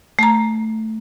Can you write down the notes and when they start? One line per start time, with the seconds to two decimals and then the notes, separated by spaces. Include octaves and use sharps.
0.19 A3 A#5